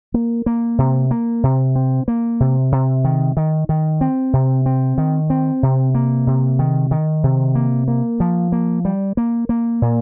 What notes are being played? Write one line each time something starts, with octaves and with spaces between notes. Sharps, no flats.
A#3
A#3
C3
A#3
C3
C4
A#3
C3
C3
D#3
D#3
D#3
C4
C3
C4
D#3
C4
C3
A#3
C3
D#3
D#3
C3
A#3
A#3
F3
A#3
G3
A#3
A#3
A#2